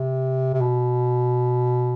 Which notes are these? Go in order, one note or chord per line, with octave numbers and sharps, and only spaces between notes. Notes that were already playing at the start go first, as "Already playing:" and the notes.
Already playing: C3
C3
B2